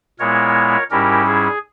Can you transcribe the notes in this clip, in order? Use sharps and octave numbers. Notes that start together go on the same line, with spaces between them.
A#2 G#3 B3 E4 A#4 C#5
G#2 G3 C#4 E4 G4 A#4
G#4